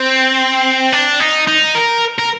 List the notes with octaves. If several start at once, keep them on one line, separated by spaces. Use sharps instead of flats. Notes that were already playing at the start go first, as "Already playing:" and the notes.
Already playing: C4
D4
D#4
D#4
A#4
A#4